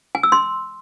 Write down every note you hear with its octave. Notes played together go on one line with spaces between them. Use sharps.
G#5
E6
C6